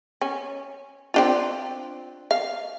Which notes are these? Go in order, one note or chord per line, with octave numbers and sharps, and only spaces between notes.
C#4
C4 D4 F4
F5